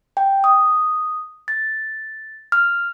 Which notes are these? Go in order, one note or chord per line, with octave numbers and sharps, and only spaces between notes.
G5
D#6
A6
F6